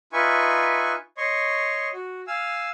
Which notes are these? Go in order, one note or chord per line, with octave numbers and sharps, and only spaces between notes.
D#4 F4 B4 E5 G#5 C#6
C#5 D#5 C6 C#6
F#4
F5 G#5 E6